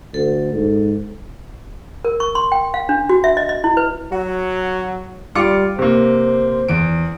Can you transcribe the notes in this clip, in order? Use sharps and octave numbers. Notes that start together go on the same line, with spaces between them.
D2 A4
G#2
A#4
C#6
C6
G5
F5
D4
F#4
E5
D#5
D#5
E4
B4
F#3 F#4
G3 F4 D6 C#7
C3 A#3 C5
E2 D7